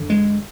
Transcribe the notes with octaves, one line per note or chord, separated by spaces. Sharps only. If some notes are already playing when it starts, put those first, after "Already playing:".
Already playing: F#2 D3
G#3